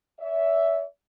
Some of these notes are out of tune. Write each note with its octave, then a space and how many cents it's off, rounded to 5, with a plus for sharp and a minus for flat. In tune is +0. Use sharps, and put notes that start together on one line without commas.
C#5 +45 E5 +0